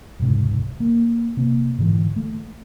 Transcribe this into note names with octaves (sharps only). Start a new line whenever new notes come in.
E1 C#2 G#2 C3
A#3
C3 A#3 C4
G#2 D3 E3
A3